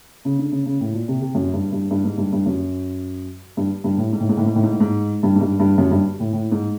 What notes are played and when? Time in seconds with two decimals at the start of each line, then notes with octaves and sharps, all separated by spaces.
0.25 C#3
0.38 D3
0.52 C#3
0.66 C#3
0.81 A2
0.94 A#2
1.08 C3
1.22 C3
1.35 F#2
1.54 G2
1.72 G2
1.91 G2
2.04 G#2
2.18 G2
2.33 G2
2.46 F#2
3.57 G2
3.84 G2
3.98 A2
4.12 G#2
4.20 A2
4.29 G#2
4.37 A2
4.46 G#2
4.55 A2
4.63 G#2
4.72 A2
4.80 G#2
5.23 G2
5.35 G#2
5.41 G2
5.60 G2
5.78 F#2
5.91 G2
6.20 A2
6.33 A2
6.52 G#2